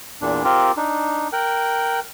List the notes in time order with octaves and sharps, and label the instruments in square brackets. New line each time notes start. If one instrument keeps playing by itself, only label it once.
[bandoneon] E2 A#2 D4
C4 F4 G4 A#4
D4 D#4
A#4 G5 F#6